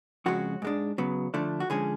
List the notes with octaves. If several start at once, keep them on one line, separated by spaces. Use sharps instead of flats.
F2 C#3 G#3 C#4 F#4
G#2 G#3 D4
C#3 F#3 B3
D3 F3 A3 D4
F#4
D3 F3 G#3 C#4 G#4